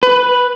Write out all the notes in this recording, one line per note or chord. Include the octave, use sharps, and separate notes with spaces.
B4